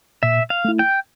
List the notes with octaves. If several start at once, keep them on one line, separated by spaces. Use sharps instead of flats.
A#2 E5
F5
A3 E4
G5